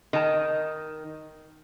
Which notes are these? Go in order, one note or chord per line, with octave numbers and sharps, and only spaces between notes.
D#3 A5